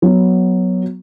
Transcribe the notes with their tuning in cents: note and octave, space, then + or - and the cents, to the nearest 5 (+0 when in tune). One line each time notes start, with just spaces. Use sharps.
F#3 +0 B3 +0